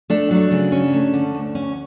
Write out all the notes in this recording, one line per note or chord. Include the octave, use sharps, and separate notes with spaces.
A3 D4
F#3
C#3
C#4
A3
D3
D2
C#4